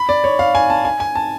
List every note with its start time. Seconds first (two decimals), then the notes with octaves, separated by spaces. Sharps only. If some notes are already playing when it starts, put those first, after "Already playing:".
Already playing: B5
0.09 D5
0.24 C#5
0.39 F5
0.55 G#5
0.70 A5
0.85 G#5
1.00 G#5
1.15 A5